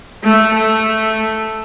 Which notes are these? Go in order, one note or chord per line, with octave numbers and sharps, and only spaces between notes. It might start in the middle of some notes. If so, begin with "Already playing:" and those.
A3
A3